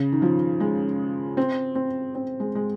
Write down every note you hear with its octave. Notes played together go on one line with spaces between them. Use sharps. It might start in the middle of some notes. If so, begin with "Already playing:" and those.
Already playing: C#3
D#3
F3
G#3
C4
C4
C4
G#3
G#3